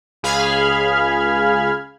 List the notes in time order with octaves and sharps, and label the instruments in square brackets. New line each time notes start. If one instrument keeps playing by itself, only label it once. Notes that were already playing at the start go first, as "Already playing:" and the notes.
[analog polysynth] C#2 G#4 F5 B5 F6 G#6